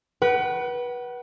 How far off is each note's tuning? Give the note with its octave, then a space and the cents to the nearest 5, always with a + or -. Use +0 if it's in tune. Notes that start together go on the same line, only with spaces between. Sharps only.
B4 -25 F#5 +30